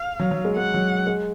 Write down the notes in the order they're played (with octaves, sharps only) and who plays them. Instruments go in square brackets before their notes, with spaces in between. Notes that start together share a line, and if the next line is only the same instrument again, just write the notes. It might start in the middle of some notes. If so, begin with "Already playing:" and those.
Already playing: [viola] F5
[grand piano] F#3
F#3
G#3
[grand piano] G#3 [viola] F#5
[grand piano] F#3
G#3